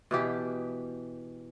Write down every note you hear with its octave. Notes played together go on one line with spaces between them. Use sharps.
B2 E3 G4